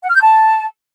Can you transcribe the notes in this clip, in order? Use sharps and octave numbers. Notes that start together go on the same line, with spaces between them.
F#5
F6
G6
A5